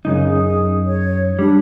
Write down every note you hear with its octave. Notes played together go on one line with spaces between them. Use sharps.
F#2 C#3 D#4
G#4
C#5
G3 D4